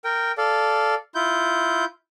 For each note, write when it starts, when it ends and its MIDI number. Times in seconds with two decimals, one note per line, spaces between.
0.04 0.32 70
0.04 0.32 79
0.38 0.95 69
0.38 0.95 74
0.38 0.95 77
1.15 1.85 64
1.15 1.85 65
1.15 1.85 91